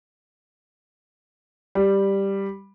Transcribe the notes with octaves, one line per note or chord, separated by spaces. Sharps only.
G3